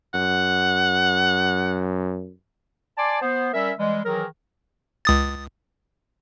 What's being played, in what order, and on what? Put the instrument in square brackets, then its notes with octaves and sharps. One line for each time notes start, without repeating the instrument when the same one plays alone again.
[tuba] F#2 [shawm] F#5
[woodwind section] D5 G#5 A5 C6 D6
B3 C5
G3 C#4 A#4 E5
E3 G3 G#3
D#3 E3 F#3 G#4 A#4
[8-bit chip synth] C#2 D#6 A6